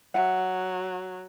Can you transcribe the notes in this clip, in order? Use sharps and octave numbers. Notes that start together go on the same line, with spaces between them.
F#3 E5 F#5